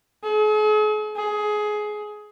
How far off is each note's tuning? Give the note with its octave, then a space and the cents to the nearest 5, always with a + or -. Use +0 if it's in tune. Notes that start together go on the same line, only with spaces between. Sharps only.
G#4 +45
G#4 +20